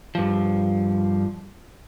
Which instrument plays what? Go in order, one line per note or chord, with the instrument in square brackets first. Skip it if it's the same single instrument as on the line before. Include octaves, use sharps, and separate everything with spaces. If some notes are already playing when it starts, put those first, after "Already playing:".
[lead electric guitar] G2 F3